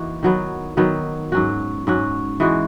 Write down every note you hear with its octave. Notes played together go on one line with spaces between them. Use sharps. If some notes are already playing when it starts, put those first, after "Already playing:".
Already playing: E3 A#3 D#4 F#4
D#3 F#3 B3
D#3 F#3 B3
G#2 F#3 C#4 F#4
G#2 F#3 C#4 F#4
E3 G#3 D#4 F#4